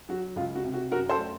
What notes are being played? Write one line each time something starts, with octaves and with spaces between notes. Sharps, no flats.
F#3 F#4
C#2 F4
F#4
C3
F#4
F#2 F#4 A#4
A4 C5
A3